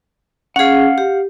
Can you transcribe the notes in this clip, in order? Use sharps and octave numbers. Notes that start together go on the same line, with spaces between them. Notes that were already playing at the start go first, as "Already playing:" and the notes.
C#4 G#4 F5 F#5
G4